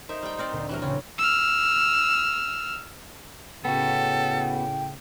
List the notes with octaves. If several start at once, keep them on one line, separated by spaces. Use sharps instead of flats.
D#4 A#4 C5 E5
G3 G5
C4 A#4 D5
D2 A#2
C3 E3 F#3 A#4
A1 C#3 C4 C#4
E6 F6
A2 C#3 B3 F#4 A4 G5